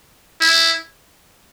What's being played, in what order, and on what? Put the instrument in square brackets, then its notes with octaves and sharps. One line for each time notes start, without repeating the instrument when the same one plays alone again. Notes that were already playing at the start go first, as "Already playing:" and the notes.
[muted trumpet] E4